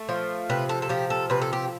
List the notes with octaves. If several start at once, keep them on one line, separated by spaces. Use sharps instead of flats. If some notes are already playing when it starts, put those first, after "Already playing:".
Already playing: A3
F3
C3 B4
A4
A4
F3 G4
A4
C3 B4
A4
G4